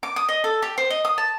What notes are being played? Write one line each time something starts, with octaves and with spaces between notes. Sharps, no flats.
D6
D#6
D#5
A4
G4
C5
D#5
D#6
A5